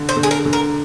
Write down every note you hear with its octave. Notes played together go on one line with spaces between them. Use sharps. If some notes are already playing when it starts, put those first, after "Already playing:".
Already playing: D3
C5
D3
G#4
A#4
D3
A#4